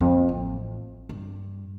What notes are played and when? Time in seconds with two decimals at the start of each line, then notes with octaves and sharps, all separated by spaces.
0.01 F2 A#3
0.29 A1
1.09 G2